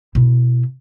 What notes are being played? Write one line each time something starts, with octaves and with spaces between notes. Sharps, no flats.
B2 E4